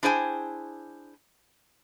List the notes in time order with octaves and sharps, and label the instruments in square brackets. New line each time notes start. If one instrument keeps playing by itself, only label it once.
[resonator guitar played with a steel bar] D4 E4 G#4 C5 G5 G#5